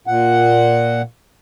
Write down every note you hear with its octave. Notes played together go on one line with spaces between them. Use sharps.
A#2 F#5